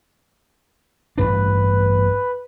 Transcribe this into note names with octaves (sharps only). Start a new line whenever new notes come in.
A1 G2 D4 B4